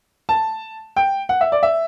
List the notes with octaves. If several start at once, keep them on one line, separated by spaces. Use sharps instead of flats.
A5
G5
F#5
E5
D5
E5